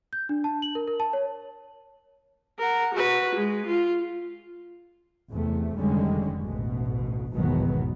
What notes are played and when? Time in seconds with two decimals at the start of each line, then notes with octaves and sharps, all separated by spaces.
0.13 G6
0.29 D4
0.44 A5
0.62 F#7
0.75 A#4
0.88 A#4
1.00 A5
1.13 C#5
2.59 A#4 F#5
2.94 F#4 B4
3.35 G#3
3.66 F4
5.29 E2 C3 A3
5.77 F1 D3 D#3 G3 G#3 C#4
6.42 A1 D2 B2
7.33 G#1 E2 B2 D#3 F#3 B3